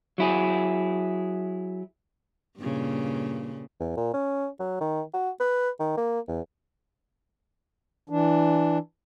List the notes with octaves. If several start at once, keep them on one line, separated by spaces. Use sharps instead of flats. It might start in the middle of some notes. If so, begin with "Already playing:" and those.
F#3 E4 G#4
G2 A#2 C#3
E2
A#2
C#4
F#3
D#3
F#4
B4
D#3
A#3
E2
E3 D4